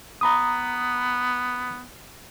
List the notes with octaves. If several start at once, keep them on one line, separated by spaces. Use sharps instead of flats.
B3 A#5 B5 D#6